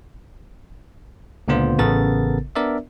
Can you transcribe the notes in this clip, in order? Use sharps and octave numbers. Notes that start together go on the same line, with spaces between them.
C#2 A#2 D3 B3 F4 C5
A1 C#3 B3 A4 A#4 A6
B3 D4 A#4 D5 E5